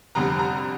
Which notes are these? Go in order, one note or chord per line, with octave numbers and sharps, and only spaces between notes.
F1 F2 D3 G3 A#5
A#5